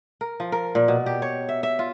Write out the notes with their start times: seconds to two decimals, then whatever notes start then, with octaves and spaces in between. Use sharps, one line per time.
0.21 A#4
0.40 F3
0.52 A#4
0.75 A#2
0.88 B2
1.06 G4
1.22 C#5
1.49 E5
1.63 E5
1.79 F4